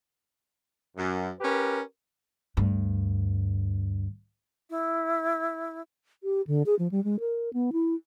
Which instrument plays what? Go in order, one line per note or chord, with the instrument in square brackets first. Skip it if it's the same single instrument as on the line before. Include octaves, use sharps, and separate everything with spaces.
[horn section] F#2
C#4 G4 A#4 B4
[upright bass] D2 G2
[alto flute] E4
[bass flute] G4
D3
G#4
F3
G3
G#3
A#4
B3
E4